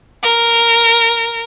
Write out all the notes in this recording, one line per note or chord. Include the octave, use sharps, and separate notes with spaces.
A#4